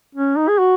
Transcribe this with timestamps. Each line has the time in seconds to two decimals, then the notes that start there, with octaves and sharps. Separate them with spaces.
0.15 C#4
0.36 D#4
0.48 G#4
0.59 F#4